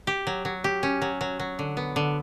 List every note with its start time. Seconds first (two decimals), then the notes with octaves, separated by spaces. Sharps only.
0.07 G4
0.27 F#3
0.45 F#3
0.64 G4
0.83 C#4
1.02 F#3
1.21 F#3
1.39 F#3
1.59 D3
1.77 B3
1.96 D3